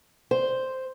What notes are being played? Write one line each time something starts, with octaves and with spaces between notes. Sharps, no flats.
C5